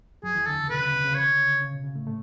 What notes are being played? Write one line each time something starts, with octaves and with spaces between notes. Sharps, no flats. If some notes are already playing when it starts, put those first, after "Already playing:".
F#2 F#3 G#4
E2 E3
D2 D3 A4
C#3
B2 B4
C#3
B2
C#3
C#3 C#5
D3
C#3
C#3
B2
C#3
A2 A3
A2 A3